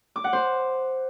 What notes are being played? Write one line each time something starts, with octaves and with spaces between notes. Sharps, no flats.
D6
F#5
C5